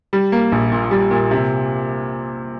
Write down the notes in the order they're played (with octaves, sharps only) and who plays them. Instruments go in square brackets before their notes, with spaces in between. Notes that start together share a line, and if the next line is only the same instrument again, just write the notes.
[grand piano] G3
A#3
A#1
A#2
G3
A#2
C3